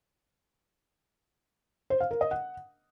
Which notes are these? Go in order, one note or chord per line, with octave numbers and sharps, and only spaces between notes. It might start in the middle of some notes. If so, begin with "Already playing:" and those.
C5
F5
A#4
D#5
F#5